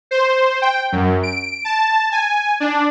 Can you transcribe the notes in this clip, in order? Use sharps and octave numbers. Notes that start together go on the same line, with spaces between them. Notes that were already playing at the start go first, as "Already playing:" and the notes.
C5
G5
F#2
D7
A5
G#5
D4